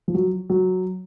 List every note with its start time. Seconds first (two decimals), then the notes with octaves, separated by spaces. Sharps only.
0.08 F3
0.15 F#3
0.50 F#3